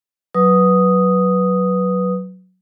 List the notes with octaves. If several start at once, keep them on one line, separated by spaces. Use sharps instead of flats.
F#3 B4 D#6